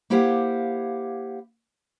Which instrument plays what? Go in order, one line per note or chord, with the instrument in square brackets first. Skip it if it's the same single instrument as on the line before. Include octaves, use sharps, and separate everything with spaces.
[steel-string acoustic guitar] A#3 E4 G4 C5 F5 F#5